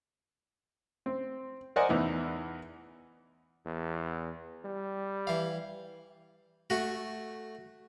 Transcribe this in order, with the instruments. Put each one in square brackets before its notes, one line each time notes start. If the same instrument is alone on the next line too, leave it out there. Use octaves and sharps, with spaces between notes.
[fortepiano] C4
A#4 C5 D5 D#5 F#5 G#5
E2 E3 D#4
[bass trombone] E2
G3
[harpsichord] E3 F5
A3 F#4